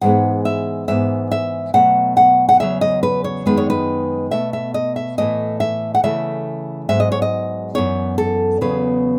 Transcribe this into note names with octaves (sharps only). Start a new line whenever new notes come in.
G#2 E3 G#3 B3 F#5
E5
G#2 E3 B3 E5
E5
B2 F#3 A3 F#5
F#5
F#5
E2 C#3 F#3 E5
D#5
B4
C#5
F#2 D#3 G#3 B3 B4
C#5
B4
B2 A3 E5
E5
D#5
E5
A2 E3 A3 D#5
E5
F#5
C#3 E3 A3 E5
G#2 F#3 B3 E5
D#5
C#5
D#5
F#2 E3 B3 C#5
A4
E2 C#3 F#3 B3 B4